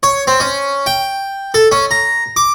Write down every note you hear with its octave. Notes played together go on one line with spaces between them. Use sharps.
C#5
C4
C#4
G5
A4
C#4
A#5
D6